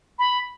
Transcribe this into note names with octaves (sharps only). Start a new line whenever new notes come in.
B5